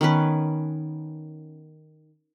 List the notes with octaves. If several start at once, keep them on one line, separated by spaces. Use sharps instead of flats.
D#3 B3 C#4 B4